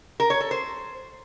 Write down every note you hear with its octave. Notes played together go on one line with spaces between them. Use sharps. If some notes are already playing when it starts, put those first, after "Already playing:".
A#4
C#5
A4
C5